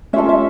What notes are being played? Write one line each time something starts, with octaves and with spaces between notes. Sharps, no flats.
C#4 F4 A4 E5
E5